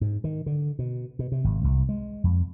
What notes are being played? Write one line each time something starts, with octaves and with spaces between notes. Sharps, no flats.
G#2
D#3
D3
B2
B2
C3
G#1
C2
G#3
F2